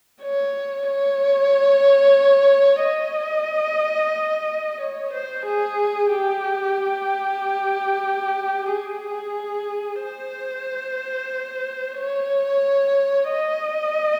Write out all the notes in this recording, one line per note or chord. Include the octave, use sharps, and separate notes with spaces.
C#5
C#5
D#5
C#5
C5
G#4
G4
G#4
C5
C#5
D#5